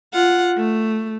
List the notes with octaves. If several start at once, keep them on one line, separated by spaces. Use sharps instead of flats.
F4 F#5
A3